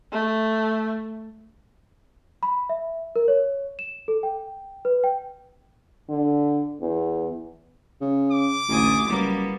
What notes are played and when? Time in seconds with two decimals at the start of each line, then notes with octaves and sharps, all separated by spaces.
0.12 A3
2.43 B5
2.69 E5
3.16 A#4
3.28 C#5
3.79 E7
4.08 A4
4.23 G5
4.85 B4
5.04 G5
6.09 D3
6.81 E2
8.01 C#3
8.31 D6
8.68 A1 D2 G#5 D#6
9.09 F#1 G3 A#3 B3